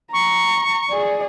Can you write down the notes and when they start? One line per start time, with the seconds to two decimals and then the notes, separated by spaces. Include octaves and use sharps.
0.12 A#5 C#6
0.90 G#4 D5